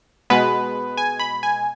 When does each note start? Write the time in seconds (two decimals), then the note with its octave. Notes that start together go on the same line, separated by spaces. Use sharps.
0.30 B2 G#3 B3 B4
0.97 G#5
1.19 B5
1.43 G#5